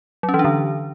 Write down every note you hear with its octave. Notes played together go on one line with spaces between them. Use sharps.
F#3
C#4
E3
D4
D3